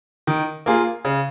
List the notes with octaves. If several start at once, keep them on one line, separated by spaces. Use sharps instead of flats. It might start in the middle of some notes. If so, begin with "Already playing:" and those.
D#3
A#3 F4 G#4
C#3